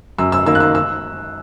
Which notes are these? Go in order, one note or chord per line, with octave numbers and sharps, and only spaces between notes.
F#2 E6
E6
D#3 A#3 E6
F#6
E6
E6